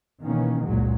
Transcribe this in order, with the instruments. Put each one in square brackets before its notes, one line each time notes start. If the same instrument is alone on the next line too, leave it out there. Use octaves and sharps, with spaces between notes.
[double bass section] B2 D#3 E3 A#3 C#4
F#1 C#2 A#2 F#3 G#3